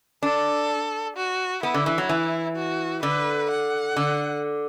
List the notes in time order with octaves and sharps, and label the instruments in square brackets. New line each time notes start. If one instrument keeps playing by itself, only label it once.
[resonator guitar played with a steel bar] D4 [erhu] A4
[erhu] F#4
[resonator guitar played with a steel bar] B3 [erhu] E4
[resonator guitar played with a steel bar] D3
E3
F#3
E3
[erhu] F#4
[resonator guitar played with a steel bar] D3 [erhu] B4
[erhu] F#5
[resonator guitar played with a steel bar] D3